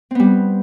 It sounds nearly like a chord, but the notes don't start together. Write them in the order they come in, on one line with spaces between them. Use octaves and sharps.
C4 B3 G3